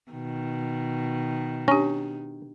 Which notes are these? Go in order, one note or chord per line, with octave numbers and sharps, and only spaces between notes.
B2 D#3
C#4 D4 G4